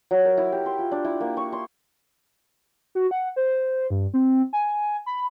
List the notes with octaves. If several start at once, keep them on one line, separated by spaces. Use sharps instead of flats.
F#3
A#4
E4
G4
C6
F4
D4
E4
A#3
C#6
C6
F#4
F#5
C5
G2
C4
G#5
B5